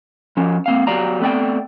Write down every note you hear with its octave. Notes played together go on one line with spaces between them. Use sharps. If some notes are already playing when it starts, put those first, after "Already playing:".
F3 C#4
A#3 C4 F5
F#3 B3 G4 D5 F5 A#5
A3 B3 C4 D5 G5